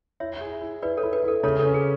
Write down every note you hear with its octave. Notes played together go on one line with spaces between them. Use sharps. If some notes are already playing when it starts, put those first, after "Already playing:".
E4 C#5 E5
G#4
E4
E4 B4 D5
A4 C#5
E4
B4
E4 A4
C#3 A4 C#5
A4
C#4
G#4